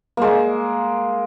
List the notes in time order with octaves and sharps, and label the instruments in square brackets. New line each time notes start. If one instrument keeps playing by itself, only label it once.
[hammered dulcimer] G#3 A#3